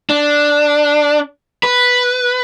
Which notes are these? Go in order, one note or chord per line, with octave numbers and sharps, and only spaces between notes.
D4
B4